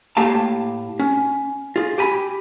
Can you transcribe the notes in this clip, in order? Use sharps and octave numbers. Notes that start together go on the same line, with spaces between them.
A2 A#3 G4 F5 A5
C#4
F4 G#4
G4 G#5 B5